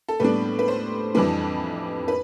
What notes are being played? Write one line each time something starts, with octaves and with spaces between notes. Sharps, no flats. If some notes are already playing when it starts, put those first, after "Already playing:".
A4
A2 G3 B3 D4 B4
B4
C5
F2 E3 G3 D4 B4
B4